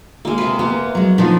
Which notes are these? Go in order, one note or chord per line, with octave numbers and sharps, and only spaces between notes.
G#3 A#3
C3 B4
A#3 B3
F#3 G#3
A#2 F3 B3 D4 D#4